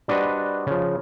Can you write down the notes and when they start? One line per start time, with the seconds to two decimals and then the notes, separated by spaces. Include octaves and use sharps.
0.08 G3 D4 F#4 B4 C5 D#5
0.67 C#3 F3